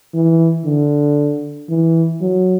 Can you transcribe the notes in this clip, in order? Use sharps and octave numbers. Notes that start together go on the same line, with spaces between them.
E3
D3
E3
F#3